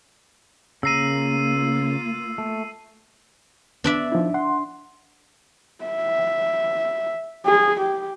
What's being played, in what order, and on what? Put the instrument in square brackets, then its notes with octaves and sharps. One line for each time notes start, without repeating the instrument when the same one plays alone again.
[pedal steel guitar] C#3 A#5 [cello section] A#3 F4 [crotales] E6 C7 D#7
[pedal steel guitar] A3
[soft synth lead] B3 [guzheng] D4 D5 E5
[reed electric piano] F3 D#4 E4
[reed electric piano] F#5 [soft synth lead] C6
[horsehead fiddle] E5
G#4
G4